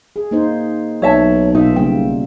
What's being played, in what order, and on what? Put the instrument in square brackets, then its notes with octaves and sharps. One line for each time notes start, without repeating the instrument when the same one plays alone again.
[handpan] G#4
A#3 D#4 C5
[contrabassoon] B1 [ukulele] C#5 E5 A5
[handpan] B2 F4 E5 [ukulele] D#4
[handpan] C#3 G3 A#3 [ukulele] G5